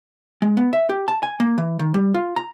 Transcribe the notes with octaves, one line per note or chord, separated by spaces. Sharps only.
G#3
B3
E5
G4
A5
G#5
A#3
E3
D#3
G3
F4
A#5